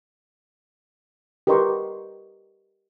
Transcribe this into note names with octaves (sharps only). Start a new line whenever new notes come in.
G4 A#4 B4 D#5 C6 C#6